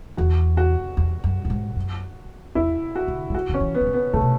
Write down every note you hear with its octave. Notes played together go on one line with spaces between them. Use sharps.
E2 F#4
F#4
E2
F#2
F#2
G#2
F#2
E2 E4
F#4
D3
F#3
E3 F#4
D3 C#4
E3
B3
E3
D3
B3
C#3 A3
B2